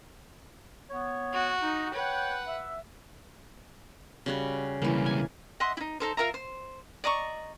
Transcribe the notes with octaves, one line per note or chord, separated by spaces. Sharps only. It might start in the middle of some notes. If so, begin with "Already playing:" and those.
B3 C#5
F#4
D#4
B4 C#5 F#5 G5
E5
C#3 G3 F#4
C#2 E3 G3 A#3
G#5
D#5 E5 F#5 C6
D#4 E4
D#4 A4 C5
F4 A#4 E5 A#5
C5
D5 D#5 A#5 C#6